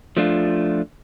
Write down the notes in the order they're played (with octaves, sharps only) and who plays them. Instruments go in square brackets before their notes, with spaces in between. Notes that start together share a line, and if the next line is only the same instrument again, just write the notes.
[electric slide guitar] F3 A3 D4 F4